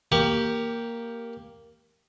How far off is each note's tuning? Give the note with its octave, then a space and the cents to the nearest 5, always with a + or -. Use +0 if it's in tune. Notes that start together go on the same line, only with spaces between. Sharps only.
A#3 +0 G4 +0 C#6 +35